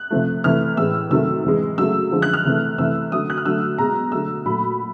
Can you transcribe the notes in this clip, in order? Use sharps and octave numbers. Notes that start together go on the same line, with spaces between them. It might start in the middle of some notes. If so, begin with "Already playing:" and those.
Already playing: F#6
C3 F3 A3
C3 E3 A3 F6
A2 E3 G#3 E6
C3 D#3 F#3 A3 E6
C3 E3 G#3
C#3 F#3 A3 E6
D3 F3 G#3
F#6
F6
C3 E3 A3
C3 E3 A3 E6
D3 F#3 A3 D#6
F#6
F6
D3 F#3 A3 E6
B2 G#3 A#5
D3 F#3 A3 E6
A#2 F#3 A3 B5